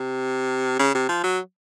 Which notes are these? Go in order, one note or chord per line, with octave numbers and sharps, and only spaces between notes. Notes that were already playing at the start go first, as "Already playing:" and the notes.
Already playing: C3
C#3
C3
F3
F#3